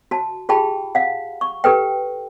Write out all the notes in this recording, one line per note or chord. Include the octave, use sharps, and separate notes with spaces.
F#4 A5
F4 G4 G#4 G5 A5 B5
F5 F#5
C#6
G4 A4 B4 G5